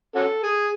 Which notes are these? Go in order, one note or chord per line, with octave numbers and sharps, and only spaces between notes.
C#4 F#4 A4
G#4